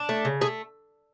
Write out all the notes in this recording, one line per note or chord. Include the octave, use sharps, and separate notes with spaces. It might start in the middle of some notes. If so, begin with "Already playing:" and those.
Already playing: D4
A3
C#3
A3 G#4